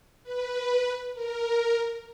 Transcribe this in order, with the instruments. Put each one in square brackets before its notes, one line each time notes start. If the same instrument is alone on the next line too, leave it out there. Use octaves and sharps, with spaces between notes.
[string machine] B4
A#4